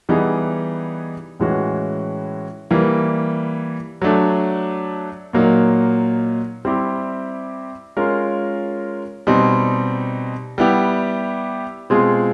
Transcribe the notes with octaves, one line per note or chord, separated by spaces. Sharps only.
E3 G3 B3 D#4 G#4
A2 E3 G#3 C#4 F#4
E3 G3 A#3
F#3 A3 D4
A#2 F#3 A#3 D#4
G3 C4 E4 G4
G#3 C#4 F4 A#4
B2 G3 C4 D#4
G3 B3 E4 G4
B2 G#3 C4 F4 G#4